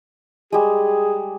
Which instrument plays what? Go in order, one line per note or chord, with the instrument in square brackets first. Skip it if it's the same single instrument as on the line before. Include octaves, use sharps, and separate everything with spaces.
[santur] G3 G#3 [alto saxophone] G#4